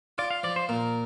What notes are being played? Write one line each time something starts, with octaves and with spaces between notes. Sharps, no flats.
F4 D5
F5
F3 D5
C5
A#2 A#4